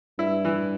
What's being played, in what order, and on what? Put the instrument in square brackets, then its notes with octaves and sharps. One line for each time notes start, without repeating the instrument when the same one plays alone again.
[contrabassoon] G2 [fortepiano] E4
[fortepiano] E3